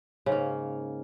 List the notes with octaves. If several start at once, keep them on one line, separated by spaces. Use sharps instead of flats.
G#2 C#3 A#3